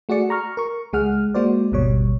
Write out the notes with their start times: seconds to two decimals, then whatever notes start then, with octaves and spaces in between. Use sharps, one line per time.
0.09 A3 F#4 G#4 D5 C#7
0.30 A#5 C#6 F6
0.57 A#4 C#6
0.93 C#2 G#3 G#4 F#5 F6
1.35 G#3 A#3 F#4 C5 D5
1.72 G#1 D#2 B2 G3 C#5